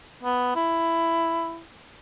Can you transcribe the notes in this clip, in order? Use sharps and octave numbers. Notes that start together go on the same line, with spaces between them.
B3
E4